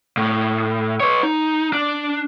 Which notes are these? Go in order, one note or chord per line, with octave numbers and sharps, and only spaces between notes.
A2
B4 C#5
D#4
D4